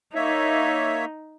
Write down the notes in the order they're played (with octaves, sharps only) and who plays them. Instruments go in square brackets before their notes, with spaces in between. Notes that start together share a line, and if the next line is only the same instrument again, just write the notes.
[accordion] A#3 C#5 E5 [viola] D#4